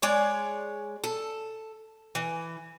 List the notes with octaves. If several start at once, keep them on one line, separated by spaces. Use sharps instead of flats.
G#3 C#5 D5
A4
E3